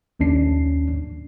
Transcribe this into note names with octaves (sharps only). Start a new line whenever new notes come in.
A#1 D#2 C#4 D4 C7